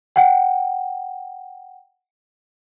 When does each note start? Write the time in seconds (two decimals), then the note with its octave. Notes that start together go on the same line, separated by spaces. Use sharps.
0.16 F#5 G5